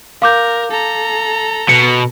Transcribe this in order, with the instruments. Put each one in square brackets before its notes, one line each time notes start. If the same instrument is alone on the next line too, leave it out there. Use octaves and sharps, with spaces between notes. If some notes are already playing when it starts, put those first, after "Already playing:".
[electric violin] A#4 [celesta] F5 D6 G6
[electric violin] A4 A#5
[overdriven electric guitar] B2 [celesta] C#7